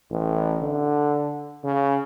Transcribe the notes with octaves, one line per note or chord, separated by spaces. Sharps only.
A1
D3
C#3